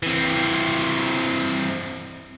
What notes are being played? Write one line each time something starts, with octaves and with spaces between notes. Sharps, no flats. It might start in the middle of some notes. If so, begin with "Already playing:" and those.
E3 C4